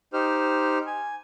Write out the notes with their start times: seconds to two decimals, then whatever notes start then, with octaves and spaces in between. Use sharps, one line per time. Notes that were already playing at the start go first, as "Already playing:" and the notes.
0.13 D#4 G4 C5 F6
0.87 G#5